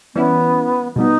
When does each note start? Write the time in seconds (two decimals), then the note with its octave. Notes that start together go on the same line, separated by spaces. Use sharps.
0.15 E3 G3 B3 C#4 E4
0.96 B2 G3 B3 D#4